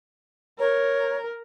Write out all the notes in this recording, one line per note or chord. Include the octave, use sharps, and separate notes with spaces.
A#4 C#5